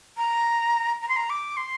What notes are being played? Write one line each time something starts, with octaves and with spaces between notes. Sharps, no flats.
A#5
A#5
C6
A#5
D6
C6